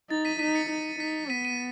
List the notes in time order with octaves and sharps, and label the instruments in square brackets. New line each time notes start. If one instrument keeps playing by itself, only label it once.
[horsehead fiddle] D#4 [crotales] A6
[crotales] B6 D#7
[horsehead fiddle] D#4 [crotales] B6 D#7
[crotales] A6 C#7
[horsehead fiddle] D#4
[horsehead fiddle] D#4 [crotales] B6
[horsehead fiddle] B3 [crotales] B6 D#7
[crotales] D#7